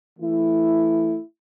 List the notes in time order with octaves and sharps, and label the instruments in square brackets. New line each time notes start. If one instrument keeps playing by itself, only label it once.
[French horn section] E3 A3 E4